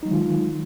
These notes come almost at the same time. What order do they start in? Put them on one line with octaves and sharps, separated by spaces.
D#4 F#3 G#3 D#3 F4